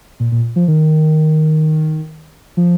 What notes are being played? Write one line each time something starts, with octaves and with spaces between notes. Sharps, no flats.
A#2
A#2
F3
D#3
F3